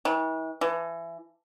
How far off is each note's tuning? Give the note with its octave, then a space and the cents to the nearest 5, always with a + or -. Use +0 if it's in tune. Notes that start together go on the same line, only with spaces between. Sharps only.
E3 -40
E3 +25